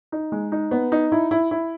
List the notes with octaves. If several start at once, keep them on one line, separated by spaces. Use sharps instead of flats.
D#4
G#3
D#4
B3
D#4
E4
E4
E4